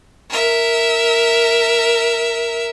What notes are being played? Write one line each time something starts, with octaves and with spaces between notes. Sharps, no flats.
A#4 E5